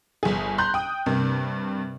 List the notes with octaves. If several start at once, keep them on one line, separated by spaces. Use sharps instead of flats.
G1 G#4
A#5 C6 F#6 G6
G5 D#6
G2 C3 A#3